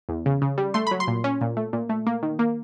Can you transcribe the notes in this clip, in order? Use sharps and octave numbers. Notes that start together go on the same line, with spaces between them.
E2
C#3
C#3
G3
A3 C6
F#3 B5
C6
A#2
C#4
A#2
A3
A#2
A3
A#3
D#3
A#3